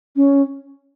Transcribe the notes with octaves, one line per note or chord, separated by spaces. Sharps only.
C#4